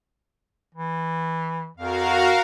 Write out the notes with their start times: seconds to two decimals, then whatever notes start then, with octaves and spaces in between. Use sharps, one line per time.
0.75 E3
1.77 F2 F#4 A#4 F5